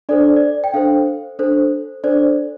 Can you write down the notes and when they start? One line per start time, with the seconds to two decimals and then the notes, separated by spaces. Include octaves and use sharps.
0.09 D4 A4 C5 D5
0.36 D5
0.64 G5
0.74 D4 A4 C5 F5
1.39 D4 A4 C5
2.04 D4 A4 C5 D5